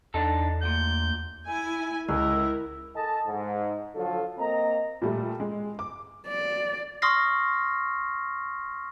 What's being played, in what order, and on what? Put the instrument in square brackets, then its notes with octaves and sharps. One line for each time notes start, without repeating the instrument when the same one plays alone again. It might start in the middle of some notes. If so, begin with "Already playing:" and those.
[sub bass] E2 [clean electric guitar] D4 D#4 A4
[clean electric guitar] D2 A#2 [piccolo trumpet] G6
[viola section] E4 G#5
[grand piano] C#2 [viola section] E4 A#4 [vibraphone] E6
[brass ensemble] A4 D#5 G#5 A5
G#2
D3 F3 F#3 F4 A4
A#3 C4 D#5 A#5
[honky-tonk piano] A#2 G3 A3
G#3
D6
[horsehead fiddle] D5
[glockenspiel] C6 C#6 D#6 F6 A#6 C7